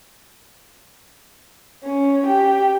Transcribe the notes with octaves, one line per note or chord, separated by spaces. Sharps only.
C#4
G4